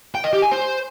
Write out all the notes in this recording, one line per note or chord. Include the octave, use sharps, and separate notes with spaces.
G5
D#5
G4
G#5
C5